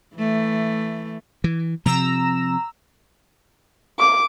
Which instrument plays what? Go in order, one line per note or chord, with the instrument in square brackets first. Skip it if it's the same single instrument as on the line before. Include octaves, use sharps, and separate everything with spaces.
[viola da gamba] E3 A3
[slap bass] E3
[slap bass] C3 F3 C4 [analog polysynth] A#5 E6
[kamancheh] D6